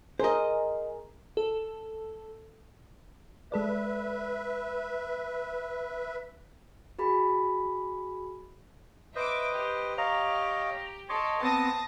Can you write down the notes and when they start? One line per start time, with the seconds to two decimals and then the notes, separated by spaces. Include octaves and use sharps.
0.20 G#4 A#4 C5 D#5
1.37 A4
3.52 G#3 A4 B4 D5 E5
6.99 F#4 G#4 B5
9.15 B4 C5 D#5 E5 D6
9.53 G4
9.98 C#5 D#5 F5 A#5
11.09 A4 C#5 D#5 C6 D6
11.41 B3 C4 A5 D#6 A#6